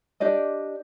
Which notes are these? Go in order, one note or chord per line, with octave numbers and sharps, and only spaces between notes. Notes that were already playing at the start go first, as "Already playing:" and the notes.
D4 G4 D5 D#5